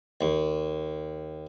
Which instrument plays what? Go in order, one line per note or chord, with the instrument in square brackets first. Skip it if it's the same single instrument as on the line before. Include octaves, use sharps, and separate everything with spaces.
[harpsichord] D#2